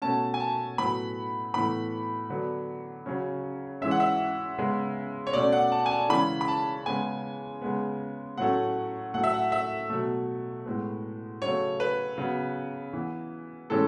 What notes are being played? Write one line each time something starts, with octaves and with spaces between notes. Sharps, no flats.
B2 A3 C#4 A5
G#5
A5
A2 F#3 B3 B5
A2 E3 B3 B5
D3 F#3 B3
C#3 F#3 C#4
E3 G#3 C#4 E5
F#5
E5
C#3 G#3 B3
C#5
B2 A3 C#4 D5
F#5
A5
G#5
A5
C#3 E3 G#3 C#4 B5
B5
A5
C#3 G#3 B3 G#5
C#3 G#3 B3
A2 F#3 A3 C#4 F#5
A2 F#3 A3 F#5
E5
F#5
E5
B2 F#3 A3
A2 G#3 B3
C#3 F#3 A3 C#5
B4
C#3 F#3 B3
E3 B3
A2 E3 G#3 C#4 A4